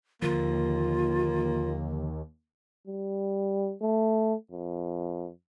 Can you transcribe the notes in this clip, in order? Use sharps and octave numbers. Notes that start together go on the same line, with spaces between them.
D#2 D3 F3 A#3 F4
G3
A3
F2